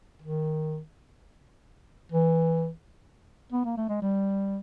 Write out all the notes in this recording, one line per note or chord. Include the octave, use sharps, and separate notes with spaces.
D#3
E3
B3
A#3
A3
G#3
G3